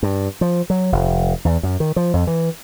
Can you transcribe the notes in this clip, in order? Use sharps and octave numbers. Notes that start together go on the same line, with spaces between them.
G2
F3
F#3
F1
E2
F#2
D#3
F3
F2
E3